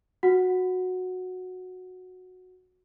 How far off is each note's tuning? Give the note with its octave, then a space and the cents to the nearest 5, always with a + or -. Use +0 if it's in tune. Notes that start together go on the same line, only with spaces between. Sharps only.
F#4 -10 F#5 +0